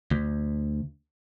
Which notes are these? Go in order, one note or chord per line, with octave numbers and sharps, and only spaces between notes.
D2